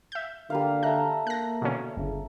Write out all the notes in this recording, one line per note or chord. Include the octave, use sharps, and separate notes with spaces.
E5 G6
D3 G3 A#3 F5
A4 E5 A#5 F#6
A#3 F#6 A#6
B2 D3 C#4
G1 C#3